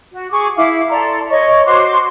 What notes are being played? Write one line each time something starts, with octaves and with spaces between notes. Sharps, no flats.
F#4
G#4 C#6 D6
E4 F5 D6
A4 D5 A#5 C6
C#5 D#5 C#6
F#4 C5 C6 D6